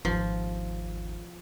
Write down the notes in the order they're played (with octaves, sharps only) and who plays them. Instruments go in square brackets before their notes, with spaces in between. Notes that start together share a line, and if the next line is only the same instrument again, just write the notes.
[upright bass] G#1 D#2 [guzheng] F3